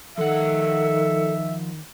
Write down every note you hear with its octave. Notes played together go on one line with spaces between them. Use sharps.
D#3 F3 A4 E5 F#5